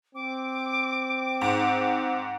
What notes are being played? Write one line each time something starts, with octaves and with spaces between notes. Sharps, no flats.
C4 D6
G#2